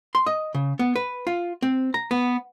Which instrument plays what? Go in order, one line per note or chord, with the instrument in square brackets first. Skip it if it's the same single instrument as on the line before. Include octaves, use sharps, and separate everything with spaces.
[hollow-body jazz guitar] C6
D#5
C#3
B3
B4
F4
C4
A#5
B3